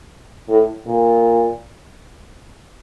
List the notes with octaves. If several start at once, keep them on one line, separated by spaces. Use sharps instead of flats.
A2
A#2